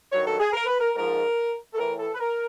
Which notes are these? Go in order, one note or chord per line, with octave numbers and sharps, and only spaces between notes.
G2 D#3 F#3 C#5
A4
G#4
A#4
B4
A#4
G#2 F3 A#4
A4
A2 E3 A#4
A4
B4
A#4